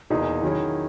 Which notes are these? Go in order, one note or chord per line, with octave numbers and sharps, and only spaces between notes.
E2 B2 A#3 D#4 G#4
D#3 F#3 C#4 E4 G#4